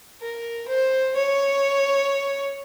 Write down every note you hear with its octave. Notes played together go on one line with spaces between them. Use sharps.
A#4
C5
C#5